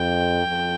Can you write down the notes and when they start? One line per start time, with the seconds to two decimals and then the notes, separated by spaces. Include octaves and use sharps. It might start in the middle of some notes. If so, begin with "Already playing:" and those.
Already playing: F2 G5
0.45 F2